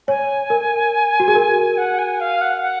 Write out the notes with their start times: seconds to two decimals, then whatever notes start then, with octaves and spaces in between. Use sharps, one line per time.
0.08 C#5 G#5
0.50 A#4
1.20 F#4
1.28 G#4
1.35 A#4
1.78 F#5
1.99 G#5
2.20 F5
2.41 F#5
2.62 F#5